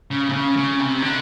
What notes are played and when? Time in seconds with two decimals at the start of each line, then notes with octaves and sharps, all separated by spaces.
0.11 C#3
0.29 C3
0.33 C#3
0.57 C#3
0.79 C3
1.02 D3